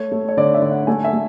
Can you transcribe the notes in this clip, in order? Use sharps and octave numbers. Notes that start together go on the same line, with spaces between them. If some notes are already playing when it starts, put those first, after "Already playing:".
Already playing: A3 C#5
A3
C#5
D3 D5
E5
D3
F#5
A3 G#5
E5
A3